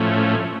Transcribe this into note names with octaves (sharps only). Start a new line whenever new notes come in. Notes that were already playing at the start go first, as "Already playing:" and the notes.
Already playing: A2 F3 A3 C#4